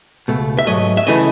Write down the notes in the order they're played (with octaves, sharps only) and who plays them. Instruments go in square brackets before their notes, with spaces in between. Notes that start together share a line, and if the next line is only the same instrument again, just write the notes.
[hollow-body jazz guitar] C#2 B2 A3
E5
G#2 F#3 A3 D#5
E5
C#3 E3 A3 D#5